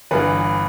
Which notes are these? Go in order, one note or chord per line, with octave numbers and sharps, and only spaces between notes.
G1 G2 E3 B4